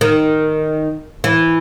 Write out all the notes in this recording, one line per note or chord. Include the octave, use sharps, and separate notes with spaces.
D#3
E3